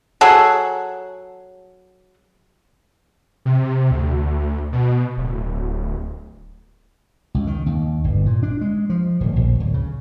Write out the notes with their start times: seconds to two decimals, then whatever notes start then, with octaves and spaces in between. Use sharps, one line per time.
0.21 F#3 G#4 A4 F#5
3.45 C3
3.91 D2
4.72 B2
5.17 D1
7.34 C#2
7.47 D#3
7.66 D#2
8.04 G1
8.26 A#2
8.43 D4
8.61 G#3
8.90 F3
9.20 D1
9.36 A#1
9.60 D1
9.74 C#3